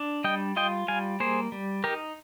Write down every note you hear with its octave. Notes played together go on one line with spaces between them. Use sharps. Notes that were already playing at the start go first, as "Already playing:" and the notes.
Already playing: D4
G3 D#5 G5
F4 D#5 G5
G3 F5 G#5
A#3 G#4 C5
G3
D#4 G4 A#4